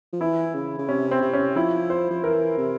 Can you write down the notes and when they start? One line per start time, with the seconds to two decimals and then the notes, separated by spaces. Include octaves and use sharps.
0.13 F3
0.21 E3 E4
0.55 C#3
0.78 C#3
0.88 C3 C#4
1.11 C4
1.22 C3
1.33 C#4
1.56 F3 E4
1.90 C5
2.10 F3
2.24 E3 A#4
2.58 C3